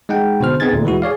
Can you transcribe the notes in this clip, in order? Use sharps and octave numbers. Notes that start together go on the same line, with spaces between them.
G#3 D#4 F#5 G5
B2 D3 C5 F6
B3 C4 D#4 G#4 G#6 A6
D2 A#2
E3 G#3 E4 F#4
G#4 C#5 D5 F5